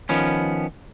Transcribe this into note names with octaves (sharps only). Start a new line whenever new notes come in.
D#3 F3 B3 C#4